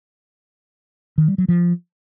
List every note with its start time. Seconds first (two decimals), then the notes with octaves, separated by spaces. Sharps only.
1.18 D#3
1.28 G3
1.38 F#3
1.48 F3